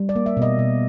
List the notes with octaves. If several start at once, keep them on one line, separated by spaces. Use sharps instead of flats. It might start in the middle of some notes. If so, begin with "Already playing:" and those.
Already playing: G3
D5
A#3
E5
B2 D#5
B2